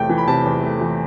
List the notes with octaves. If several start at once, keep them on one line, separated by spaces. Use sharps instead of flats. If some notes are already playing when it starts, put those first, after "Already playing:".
Already playing: E2 C3 A3 G5
E3
B5
C3 A5
E2
A3
E3